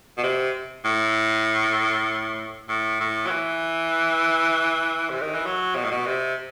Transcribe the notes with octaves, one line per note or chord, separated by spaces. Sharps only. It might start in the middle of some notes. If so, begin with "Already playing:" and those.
B2
C3
A2
A2
A2
F#3
E3
C3
D#3
E3
F#3
B2
A2
B2
C3